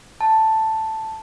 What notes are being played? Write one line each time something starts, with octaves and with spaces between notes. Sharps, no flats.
A5